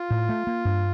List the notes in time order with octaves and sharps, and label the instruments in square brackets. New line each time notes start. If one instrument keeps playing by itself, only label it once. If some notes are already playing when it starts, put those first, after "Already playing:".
Already playing: [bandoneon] F4
[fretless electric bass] A2
A3
A#3
G2